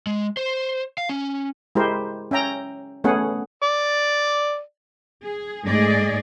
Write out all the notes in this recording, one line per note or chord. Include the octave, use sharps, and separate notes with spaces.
G#3
C5
F5
C#4
G#3 E4 G4 A#4 C5
C#4 E5 G5 A#5
A3 B3 C#4 G#4 F#5
D5
G#4
G#2 A3 G#4 D5 D#5